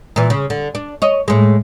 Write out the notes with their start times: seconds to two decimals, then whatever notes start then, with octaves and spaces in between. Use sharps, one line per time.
0.16 A#2 E3
0.30 C#3
0.50 D3
0.75 D4
1.02 C#5 D#5
1.28 A2 G#3